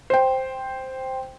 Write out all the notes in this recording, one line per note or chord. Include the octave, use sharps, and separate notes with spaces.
C5 G5